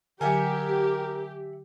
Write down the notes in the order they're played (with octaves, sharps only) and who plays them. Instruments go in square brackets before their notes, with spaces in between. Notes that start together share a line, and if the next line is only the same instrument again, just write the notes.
[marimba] D3 F#3 [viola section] G4 [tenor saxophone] A#4 [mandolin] E5 F#5 G#5